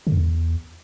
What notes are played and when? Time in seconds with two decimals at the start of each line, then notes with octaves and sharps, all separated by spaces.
0.07 D3
0.12 F#2
0.17 E2